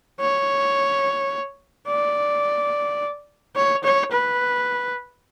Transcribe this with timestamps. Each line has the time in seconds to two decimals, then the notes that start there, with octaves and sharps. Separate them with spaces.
0.20 C#5
1.88 D5
3.56 C#5
3.84 C#5
4.12 B4